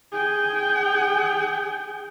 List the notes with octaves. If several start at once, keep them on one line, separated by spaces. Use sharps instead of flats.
G#4 G5